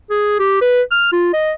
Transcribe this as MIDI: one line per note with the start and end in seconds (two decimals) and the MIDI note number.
0.11 0.35 68
0.40 0.61 67
0.62 0.82 71
0.92 1.09 89
1.13 1.32 65
1.34 1.53 75